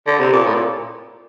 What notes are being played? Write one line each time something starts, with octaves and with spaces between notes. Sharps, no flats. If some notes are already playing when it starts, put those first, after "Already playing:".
D3
C3
A#2
A2
A#2